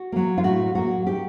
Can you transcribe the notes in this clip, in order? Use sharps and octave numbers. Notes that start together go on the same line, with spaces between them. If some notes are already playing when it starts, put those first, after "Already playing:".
Already playing: F#4
F#3 A#3
F4
A2 F#4
F#3 A#3 F#4
G4